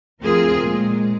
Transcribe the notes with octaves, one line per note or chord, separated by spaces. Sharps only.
D2 F3 C4 F4 G#4 A#4
A#2 G#3